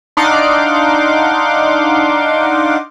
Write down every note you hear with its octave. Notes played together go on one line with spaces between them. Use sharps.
D4 D#4 F5 F#5 C6 D6